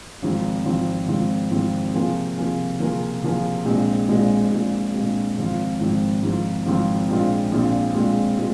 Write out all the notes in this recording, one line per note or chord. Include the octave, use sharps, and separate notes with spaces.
G#1 G#2 F3 C4 F4
G#1 G#2 F3 C4 F4
G#1 G#2 F3 C4 F4
G#1 G#2 F3 C4 F4
C3 F3 A#3 F4 G#4
C3 F3 A#3 F4 G#4
C3 F3 A#3 F4 G#4
C3 F3 A#3 F4 G#4
A#1 A#2 G#3 C4
A#1 A#2 G#3 C4
A#1 A#2 G#3 C4
A#1 A#2 G#3 C4
G#1 G#2 F3 C4 F4
G#1 G#2 F3 C4 F4
G#1 G#2 F3 C4 F4
G#1 G#2 F3 C4 F4
A#1 A#2 G#3 C4 F4
A#1 A#2 G#3 C4 F4
A#1 A#2 G#3 C4 F4
A#2 G#3